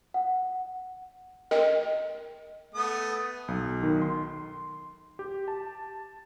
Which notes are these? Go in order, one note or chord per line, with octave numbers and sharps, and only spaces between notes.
F#5
A#4 D#5 G5
A3 B3 D#6
B1
D#3
C6
G4
A5